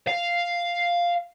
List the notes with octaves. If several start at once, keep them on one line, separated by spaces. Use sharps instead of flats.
F5